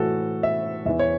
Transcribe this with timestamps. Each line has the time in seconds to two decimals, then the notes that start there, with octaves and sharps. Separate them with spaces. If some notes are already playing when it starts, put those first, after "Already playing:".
Already playing: A2 E3 F#4 A4
0.43 E5
0.86 E2 E3 E5
0.99 C#5